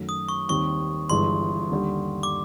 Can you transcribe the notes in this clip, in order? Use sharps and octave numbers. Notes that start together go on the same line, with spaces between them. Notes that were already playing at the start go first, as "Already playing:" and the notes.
Already playing: F#2 D#3 F#3 A3
D#6
C#6
D#2 D#3 G3 C4 C#6
G1 G2 E3 G#3 C6
D#2 D3 G3
D6